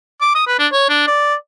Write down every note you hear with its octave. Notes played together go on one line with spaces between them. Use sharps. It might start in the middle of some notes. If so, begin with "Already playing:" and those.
D6
D#6
B4
D4
C#5
D4
D5